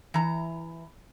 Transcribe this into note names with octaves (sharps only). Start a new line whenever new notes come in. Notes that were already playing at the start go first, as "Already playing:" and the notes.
E3 A#5